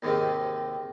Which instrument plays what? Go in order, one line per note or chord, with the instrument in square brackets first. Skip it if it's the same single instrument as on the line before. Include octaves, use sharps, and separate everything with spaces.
[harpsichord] D#2 G#2 C3 D#3